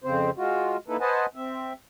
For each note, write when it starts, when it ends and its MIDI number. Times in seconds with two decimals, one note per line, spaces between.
0.04 0.30 41
0.04 0.30 49
0.04 0.30 60
0.04 0.30 72
0.37 0.77 56
0.37 0.77 65
0.37 0.77 66
0.88 0.97 58
0.88 0.97 63
0.88 0.97 64
0.88 0.97 69
0.88 0.97 71
1.00 1.26 71
1.00 1.26 72
1.00 1.26 75
1.00 1.26 78
1.00 1.26 80
1.00 1.26 81
1.35 1.73 60
1.35 1.73 76